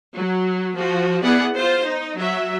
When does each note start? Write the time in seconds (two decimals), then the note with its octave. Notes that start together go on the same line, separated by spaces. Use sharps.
0.17 F#3
0.78 F3 F#4
1.24 B3 E4 G#4 D5 F#5
1.54 F4 C5
1.84 D#4
2.19 F#3 E5